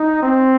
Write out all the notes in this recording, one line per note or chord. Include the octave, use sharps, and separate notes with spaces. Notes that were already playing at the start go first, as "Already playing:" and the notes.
Already playing: D#4
C4